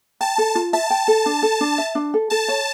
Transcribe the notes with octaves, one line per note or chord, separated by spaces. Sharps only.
G5 A5
A4
F4
E5 A5
G5
A4
D4
A4
D4
E5
D4
A4
A4 A5
C#5